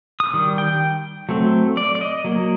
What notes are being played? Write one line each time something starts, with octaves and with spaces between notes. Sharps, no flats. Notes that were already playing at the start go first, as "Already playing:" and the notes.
D#6
D#3 G3
G5
F#3 A3 C4
D5
D5
D#5
F#3 A#3